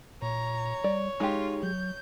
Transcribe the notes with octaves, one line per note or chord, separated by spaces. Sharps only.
A#2 C#5 A#5
G3 D5
G#3 D#4 F4 G4
F#3 G6